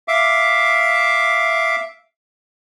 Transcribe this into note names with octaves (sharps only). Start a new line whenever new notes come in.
E5 F5 D6